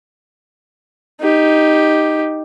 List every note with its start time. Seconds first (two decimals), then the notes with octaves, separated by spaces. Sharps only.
1.21 D#4 G4